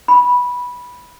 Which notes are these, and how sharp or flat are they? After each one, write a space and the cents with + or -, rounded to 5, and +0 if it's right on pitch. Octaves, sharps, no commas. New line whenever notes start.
B5 -10